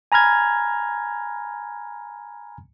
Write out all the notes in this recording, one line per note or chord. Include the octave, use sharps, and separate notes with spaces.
G#5 A#5 B5 F6 G#6